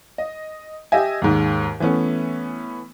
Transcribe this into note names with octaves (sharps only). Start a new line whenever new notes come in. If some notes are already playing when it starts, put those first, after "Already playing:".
D#5
G4 D#5 E5 G#5
D#2 G#2
E3 A3 B3 C#4